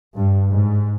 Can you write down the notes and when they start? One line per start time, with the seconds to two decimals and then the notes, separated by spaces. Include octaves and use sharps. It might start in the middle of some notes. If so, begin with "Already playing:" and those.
0.14 G2
0.50 G#2